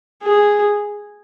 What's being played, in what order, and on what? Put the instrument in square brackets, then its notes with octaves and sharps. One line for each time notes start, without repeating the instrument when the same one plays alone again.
[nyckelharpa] G#4